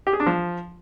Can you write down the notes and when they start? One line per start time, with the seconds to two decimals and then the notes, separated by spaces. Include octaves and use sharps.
0.07 G4
0.13 G#4
0.20 D4
0.27 F3